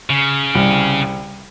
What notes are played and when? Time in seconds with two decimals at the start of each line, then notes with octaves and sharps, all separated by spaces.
0.10 C#3
0.55 C2